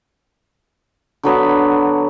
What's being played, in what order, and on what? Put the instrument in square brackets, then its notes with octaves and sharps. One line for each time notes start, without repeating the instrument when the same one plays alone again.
[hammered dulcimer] D3 F#3 B3 B5